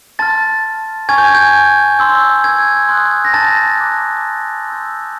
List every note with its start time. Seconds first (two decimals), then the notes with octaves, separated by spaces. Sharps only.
0.19 A5 C6 F6 A6
1.09 G#5 C#6 F6 G#6
1.18 G6
1.35 G6
1.99 C6 E6 G6
2.44 G#6
2.89 C6 D#6 F#6
3.25 A#6
3.34 A5 A6
3.78 A#5 D6 F#6
4.68 C6 E6 G6